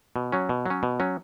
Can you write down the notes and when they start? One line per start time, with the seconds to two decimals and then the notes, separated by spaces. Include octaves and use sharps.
0.16 B2
0.32 F#3 C#4
0.49 B2
0.66 F#3 C#4
0.83 B2
1.00 F#3 C#4